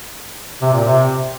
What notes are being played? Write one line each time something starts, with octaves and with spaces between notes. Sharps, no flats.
C3
A#2
C3